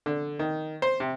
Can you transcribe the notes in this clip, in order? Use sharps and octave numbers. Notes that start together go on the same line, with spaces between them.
D3
D#3
C5
C3